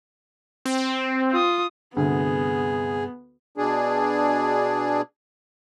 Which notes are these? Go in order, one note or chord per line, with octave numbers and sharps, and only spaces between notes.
C4
F4 D#6
D2 G2 C3 B3 G#4
B2 D4 G#4